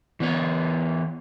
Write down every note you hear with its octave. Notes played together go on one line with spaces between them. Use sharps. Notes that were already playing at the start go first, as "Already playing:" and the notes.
E3 B3 C#5